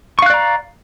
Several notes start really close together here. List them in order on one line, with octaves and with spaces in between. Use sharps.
C#6 F5 F#6 D5 A#5